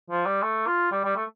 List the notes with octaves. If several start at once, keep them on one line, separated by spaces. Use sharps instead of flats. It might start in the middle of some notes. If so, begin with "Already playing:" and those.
F3
G3
A3
F4
G3
G3
A3